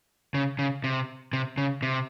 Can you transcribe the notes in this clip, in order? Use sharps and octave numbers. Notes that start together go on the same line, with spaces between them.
C#3
C#3
C3
C3
C#3
C3